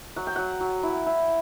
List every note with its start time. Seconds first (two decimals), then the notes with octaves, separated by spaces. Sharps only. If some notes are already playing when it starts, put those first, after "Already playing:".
0.16 F#3 F#5
0.27 G5
0.36 F#3 F#5
0.60 F#3
0.83 E4
1.06 E4